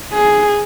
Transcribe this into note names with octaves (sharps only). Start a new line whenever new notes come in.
G#4